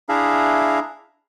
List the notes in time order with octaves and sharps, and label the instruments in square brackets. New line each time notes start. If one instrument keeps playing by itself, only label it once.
[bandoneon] D4 E4 G#4 E5 F5 A#5